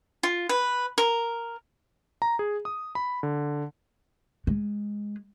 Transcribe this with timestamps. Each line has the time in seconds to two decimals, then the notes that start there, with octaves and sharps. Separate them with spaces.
0.23 F4
0.49 B4
0.98 A#4
2.22 A#5
2.39 G#4
2.65 D#6
2.95 B5
3.23 D3
4.47 G#3